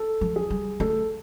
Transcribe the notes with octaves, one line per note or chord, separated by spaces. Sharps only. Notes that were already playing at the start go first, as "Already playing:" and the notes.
Already playing: A4
F3
G#4
G3
A3 A4